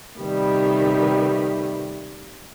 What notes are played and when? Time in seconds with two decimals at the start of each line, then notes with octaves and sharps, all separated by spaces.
0.18 C3 D#3 G3 A3 B3